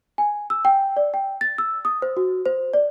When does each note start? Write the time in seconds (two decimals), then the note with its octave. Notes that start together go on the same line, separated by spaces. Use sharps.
0.18 G#5
0.50 E6
0.65 G5
0.97 D5
1.14 G5
1.41 A6
1.58 E6
1.85 D#6
2.02 C5
2.17 F#4
2.46 C5
2.74 D5